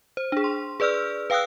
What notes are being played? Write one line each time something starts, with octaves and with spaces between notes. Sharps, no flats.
C5
D4 G#4
C6
G#4 B4 D5 E6 F6
B4 F5 G5 D#6 E6 F#6